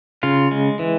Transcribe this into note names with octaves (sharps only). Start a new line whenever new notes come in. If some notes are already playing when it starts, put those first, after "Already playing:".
C#3 F4
G#3
E3